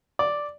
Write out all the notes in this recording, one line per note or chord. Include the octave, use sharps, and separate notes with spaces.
D5